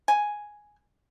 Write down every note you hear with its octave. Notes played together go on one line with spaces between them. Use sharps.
G#5